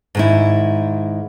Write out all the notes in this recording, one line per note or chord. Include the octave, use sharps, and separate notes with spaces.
G#2 D#3 E4